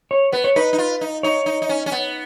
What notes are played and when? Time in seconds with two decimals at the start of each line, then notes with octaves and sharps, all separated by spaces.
0.11 C#5
0.32 B3 B4
0.44 C#5
0.56 D#4 B4
0.73 D#4
0.78 F4
1.01 D#4
1.23 D#4 C#5
1.46 D#4
1.62 D#4
1.69 C#4
1.86 C#4
1.92 B3